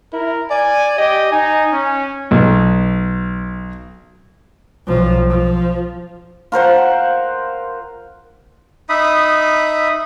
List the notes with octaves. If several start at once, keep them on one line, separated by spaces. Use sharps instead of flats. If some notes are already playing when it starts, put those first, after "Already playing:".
E4 A#4
D5 G#5
G4 D#5
D#4 G#5
C#4
B1
B1 F3
F3
F4 A#4 C5 F#5
D#4 E5 B5 D#6